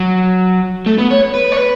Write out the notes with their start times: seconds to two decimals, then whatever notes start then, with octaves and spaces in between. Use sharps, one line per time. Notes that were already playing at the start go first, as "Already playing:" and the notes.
Already playing: F#3
0.86 A3
0.98 B3
1.11 C#5
1.35 B4
1.53 C#5
1.58 B4